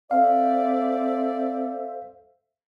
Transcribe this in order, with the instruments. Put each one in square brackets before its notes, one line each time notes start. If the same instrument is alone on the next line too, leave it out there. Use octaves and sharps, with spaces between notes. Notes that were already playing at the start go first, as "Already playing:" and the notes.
[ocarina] C4 [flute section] A4 C5 E5 [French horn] D5 [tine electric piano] F5